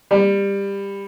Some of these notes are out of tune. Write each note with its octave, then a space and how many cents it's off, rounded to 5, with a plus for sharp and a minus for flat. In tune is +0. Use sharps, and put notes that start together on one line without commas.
G3 +20